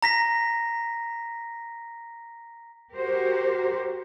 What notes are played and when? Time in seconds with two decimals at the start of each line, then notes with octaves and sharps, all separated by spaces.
0.03 A#5 A#6 B6
2.95 F#4 G4 A#4 C5